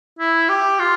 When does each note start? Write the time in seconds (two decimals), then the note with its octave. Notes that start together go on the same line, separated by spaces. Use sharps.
0.19 E4
0.49 G4
0.79 F4